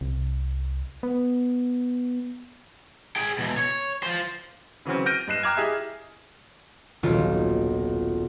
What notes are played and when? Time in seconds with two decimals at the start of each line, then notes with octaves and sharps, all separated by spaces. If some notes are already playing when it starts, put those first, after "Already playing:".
0.01 C2
1.03 B3
3.16 G#4 G5
3.39 B2 E3
3.58 C#5
4.03 F4 C5
4.85 C#3 E3 F#3 C4 C#4
5.06 F6 G6 A#6 D7 D#7
5.28 G2 D#5 F#6 C7 E7
5.43 G5 A#5 D6 F6 F#6 G#6
5.57 E4 G4 G#4 D#5 E5
7.03 D#1 B1 F4